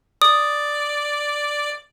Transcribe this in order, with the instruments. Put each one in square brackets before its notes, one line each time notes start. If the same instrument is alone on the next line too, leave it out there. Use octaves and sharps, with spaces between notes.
[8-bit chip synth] D5 [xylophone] D#6